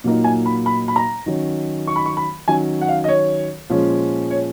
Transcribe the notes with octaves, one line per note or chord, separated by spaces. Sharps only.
A#2 F#3 A#3 D#4
G#5
B5
B5
B5
A#5
D#3 F#3 C#4
C#6
B5
C#6
B5
D#3 F#3 C#4 G#5
F#5
F5
D#5
C#5
A#2 F3 G#3 C#4
C#5